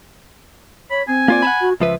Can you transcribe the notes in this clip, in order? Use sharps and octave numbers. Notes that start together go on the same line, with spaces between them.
C#5 B5
C4 G#5
A#3 F4 D5
F#5 A5 B5
F#4
C#2 F3 B4 E5